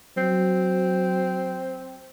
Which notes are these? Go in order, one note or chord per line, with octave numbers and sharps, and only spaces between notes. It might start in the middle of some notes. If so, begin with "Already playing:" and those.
F#3 C4